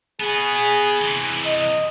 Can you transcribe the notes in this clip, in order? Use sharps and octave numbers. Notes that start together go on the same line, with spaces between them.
B3 F#4 G#4
C3 E3
D#5